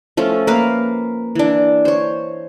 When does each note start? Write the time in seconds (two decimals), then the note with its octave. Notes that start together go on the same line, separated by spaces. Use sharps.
0.17 F3 A3 C#4 F4
0.47 A#3 B4 F5
1.35 E3 D4
1.85 C5 C#5